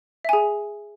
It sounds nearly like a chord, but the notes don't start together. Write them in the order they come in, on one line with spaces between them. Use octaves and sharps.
E5 G#5 G#4